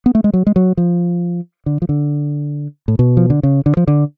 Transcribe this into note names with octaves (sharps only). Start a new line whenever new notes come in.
B3
A3
G#3
F#3
G#3
F#3
F3
D3
F3
D3
A2
B2
F3
D3
C#3
D3
F3
D3